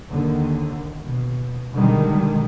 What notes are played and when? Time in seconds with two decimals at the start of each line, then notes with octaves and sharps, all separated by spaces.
0.10 D#2 D3 D#3
1.04 B2
1.74 B2 D3 D#3 G3 G#3